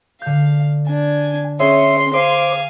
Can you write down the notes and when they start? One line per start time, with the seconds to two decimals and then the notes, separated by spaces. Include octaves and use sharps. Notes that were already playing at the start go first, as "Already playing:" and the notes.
0.22 D3 F5 G6
0.87 D4 G#5
1.60 C#4 G#4 C#5 E5 C6
2.14 C5 F5 G#5 D6